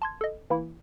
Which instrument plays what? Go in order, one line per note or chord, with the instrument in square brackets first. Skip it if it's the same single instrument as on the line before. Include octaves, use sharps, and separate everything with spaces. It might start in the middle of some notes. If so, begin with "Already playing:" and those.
[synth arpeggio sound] A5 C6 G#6
A4 D#5
E3 A#3 E4